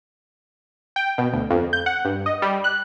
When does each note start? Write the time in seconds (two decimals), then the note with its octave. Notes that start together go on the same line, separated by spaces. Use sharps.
0.96 G5
1.18 B2
1.33 D2
1.51 F2
1.73 G6
1.86 F#5
2.05 G2
2.26 D#5
2.42 G3
2.64 F#6